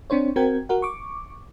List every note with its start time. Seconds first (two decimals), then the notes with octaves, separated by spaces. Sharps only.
0.10 C4 D4 C5 C#5
0.36 C4 F#4 A#4 G5 G#6
0.69 F#4 A#4 F#5
0.82 C#6 D6